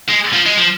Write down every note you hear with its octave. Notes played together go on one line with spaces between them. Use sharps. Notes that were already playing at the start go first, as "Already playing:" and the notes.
G#3
F3
G#3
F3